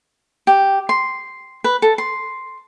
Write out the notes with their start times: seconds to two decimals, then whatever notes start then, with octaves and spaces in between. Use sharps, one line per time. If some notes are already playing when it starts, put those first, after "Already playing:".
0.47 G4
0.89 C6
1.64 B4
1.82 A4
1.98 C6